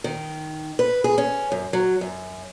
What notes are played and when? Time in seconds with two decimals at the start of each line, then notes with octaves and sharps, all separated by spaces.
0.04 D#3
0.79 B4
1.04 G#4
1.18 C#4
1.52 F#2
1.73 F#3
2.01 F#2